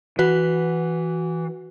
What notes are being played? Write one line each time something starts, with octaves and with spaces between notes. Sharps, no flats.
E3 F#4 B4 F#5